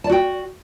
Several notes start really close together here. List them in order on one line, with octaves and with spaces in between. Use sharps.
A5 D5 F#4 G5